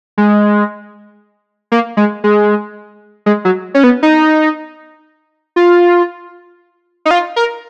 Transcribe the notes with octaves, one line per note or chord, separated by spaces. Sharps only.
G#3
A#3
G#3
G#3
G#3
F#3
C#4
B3
D#4
F4
D#4
F4
A#4